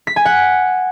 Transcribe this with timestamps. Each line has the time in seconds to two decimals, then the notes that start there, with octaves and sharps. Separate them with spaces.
0.07 B6
0.16 G#5
0.25 F#5